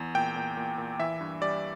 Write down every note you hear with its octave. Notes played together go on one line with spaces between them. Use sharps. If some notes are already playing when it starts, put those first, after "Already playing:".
Already playing: E2
A#2 G5
A#2
A#2
A#2
E3 E5
G2
G3 D5